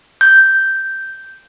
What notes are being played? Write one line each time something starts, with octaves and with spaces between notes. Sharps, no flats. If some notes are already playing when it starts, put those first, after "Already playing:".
G6